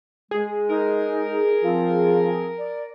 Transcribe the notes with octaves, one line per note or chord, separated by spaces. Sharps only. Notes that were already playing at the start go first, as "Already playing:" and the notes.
G#3 G#4
D#4 A#4
F3 C4 F4
D5